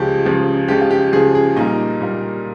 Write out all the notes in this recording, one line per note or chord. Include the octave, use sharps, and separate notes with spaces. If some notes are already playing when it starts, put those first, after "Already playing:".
Already playing: C#2 C#3 F3 G#3 G4
C#2 C#3 F3 G#3
C#2 C#3 F3 G#3 G4
F4
G4
C#2 C#3 F3 G#3 G#4
G#4
A#2 G3 A#3 D#4
A#2 G3 A#3